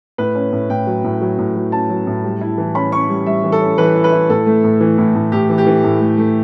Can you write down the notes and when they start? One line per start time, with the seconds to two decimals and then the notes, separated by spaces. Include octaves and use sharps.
0.18 A2 B4
0.35 C#4
0.52 A2
0.70 A2 G5
0.87 F#3
1.04 A2
1.21 F#3
1.38 A2
1.56 F#3
1.72 C#4 A5
1.90 F#3
2.07 A2
2.24 G3
2.41 E4
2.58 E3
2.75 C#4 B5
2.92 C#4 C#6
3.09 G3
3.26 G3 E5
3.44 E3
3.52 A4
3.61 C#4
3.78 E3 B4
3.95 E4
4.04 B4
4.12 E4
4.29 A2 A4
4.47 A3
4.64 A2
4.81 E3
4.98 A2
5.15 A2
5.32 A2 G4
5.49 E3
5.58 G4
5.67 E3
5.84 A2
6.01 A3
6.18 A3